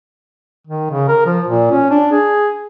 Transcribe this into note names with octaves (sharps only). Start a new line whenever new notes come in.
D#3
C#3
A#4
F3
A#2
C#4
D4
G#4